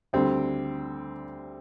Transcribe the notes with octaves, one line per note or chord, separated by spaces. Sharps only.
D2 D3 G3 C4